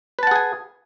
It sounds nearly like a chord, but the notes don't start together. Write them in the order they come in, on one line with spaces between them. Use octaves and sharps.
B4 A5 F#5 G#4 G#5